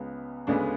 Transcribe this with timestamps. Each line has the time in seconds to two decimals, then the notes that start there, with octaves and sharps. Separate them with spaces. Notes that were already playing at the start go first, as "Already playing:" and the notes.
Already playing: C#2 C#3 G#3 B3
0.47 D2 C#3 G#3 B3 D4